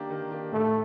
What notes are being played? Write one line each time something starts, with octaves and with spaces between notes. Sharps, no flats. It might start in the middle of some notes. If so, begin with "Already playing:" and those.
Already playing: D#3 A#3 D4 G4
D#3
A#3 D4 G4
A2 A3